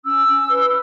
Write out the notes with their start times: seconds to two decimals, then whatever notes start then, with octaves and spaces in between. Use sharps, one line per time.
0.04 C#4 E6
0.26 C#4
0.48 B4